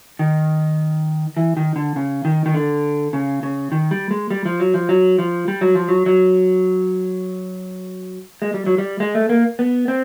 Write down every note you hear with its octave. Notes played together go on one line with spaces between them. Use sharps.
D#3
E3
D#3
D3
C#3
D#3
D#3
D3
C#3
C#3
D#3
G3
G#3
G3
F3
F#3
F3
F#3
F3
G3
F#3
F3
F#3
F#3
G#3
G3
F#3
G3
G#3
A3
A#3
B3
C4